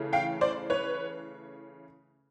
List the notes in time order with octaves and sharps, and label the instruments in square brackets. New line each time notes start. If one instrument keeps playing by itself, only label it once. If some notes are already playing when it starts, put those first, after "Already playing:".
Already playing: [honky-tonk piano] C#3 E3 A3
F5 G5
C5 D5
B4 C#5